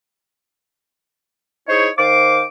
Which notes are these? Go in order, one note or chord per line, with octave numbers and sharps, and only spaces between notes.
D#4 E4 G#4 C5 C#5
D#3 C5 F5 D6